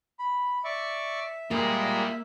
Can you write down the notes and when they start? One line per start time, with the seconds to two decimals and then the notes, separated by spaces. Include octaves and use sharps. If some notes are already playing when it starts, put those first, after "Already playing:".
0.19 B5
0.64 D5 E5 C#6
1.51 G3 G#3 A#3 F4 A#4